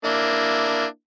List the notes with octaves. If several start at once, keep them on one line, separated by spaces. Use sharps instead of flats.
A#3 D4 E4